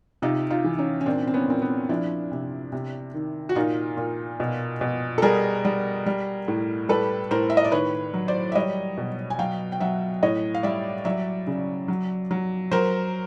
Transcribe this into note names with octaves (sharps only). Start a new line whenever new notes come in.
C3 D#4 F4
D#4 F4
E3
C#4 D#4
C#4
A#2 C4 D4
C4
B3 C#4
A#2 C4
B3
F3 D4 E4
C3
C3
D#3
F#4
A#2 D#4 F4
A#2
B2
B2
A4
G3 G#4 A#4
G3
G3
A2
G3 A4 B4
A2 A#4 C5
E5
D#5
D5
D#3 B4 C#5
F#3
C5 D5
E5
G3 C#5 D#5
B2
G#5
F#3 F5 G5
G5
F#3 E5 F#5
A2 C#5 D#5
F5
G3 D5 E5
F#3 D5 E5
C#3
F#3
F#3
F#3 A#4 C5